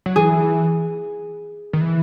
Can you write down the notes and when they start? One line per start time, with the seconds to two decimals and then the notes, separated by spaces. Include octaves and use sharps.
0.06 F#3
0.16 E3 G#4
1.73 D#3
1.81 E3